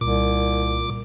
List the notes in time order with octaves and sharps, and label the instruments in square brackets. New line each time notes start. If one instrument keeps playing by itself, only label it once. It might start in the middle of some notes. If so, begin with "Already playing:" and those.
[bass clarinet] C2 [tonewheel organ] A#2 D6